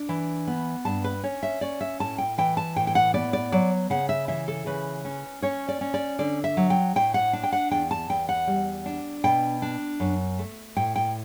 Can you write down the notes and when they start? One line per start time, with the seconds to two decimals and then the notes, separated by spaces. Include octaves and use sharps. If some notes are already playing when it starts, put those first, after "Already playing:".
Already playing: D4
0.09 E3
0.47 B3
0.85 G2 A5
1.04 B4
1.23 C#4 C#5
1.43 E5
1.61 C#4 D5
1.81 E5
2.00 A2 A5
2.18 G5
2.38 E3 G5
2.57 A5
2.76 A2 G5
2.87 G5
2.95 F#5
3.14 B3 D5
3.33 D5
3.52 F#3 D5
3.90 C#3 F#5
4.09 E5
4.28 E3 E5
4.48 A4
4.66 C#3 B4
5.05 C#4
5.42 C#4 C#5
5.68 D5
5.81 C#4
5.94 D5
6.19 D3 D5
6.44 E5
6.57 F#3
6.70 G5
6.96 A2 G5
7.14 F#5
7.33 D4
7.43 G5
7.52 F#5
7.71 E2 G5
7.91 A5
8.10 E2 G5
8.29 F#5
8.47 G3
8.86 D4
9.24 B2 G5
9.62 D4
10.00 F#2
10.39 A3
10.76 A2 G5
10.96 G5